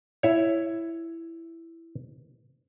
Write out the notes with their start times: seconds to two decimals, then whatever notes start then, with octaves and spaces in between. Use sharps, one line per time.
0.23 E4 C#5